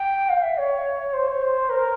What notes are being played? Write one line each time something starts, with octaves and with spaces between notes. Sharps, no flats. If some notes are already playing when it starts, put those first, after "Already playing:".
Already playing: G5
F5
E5
C#5
C5
C#5
C5
A#4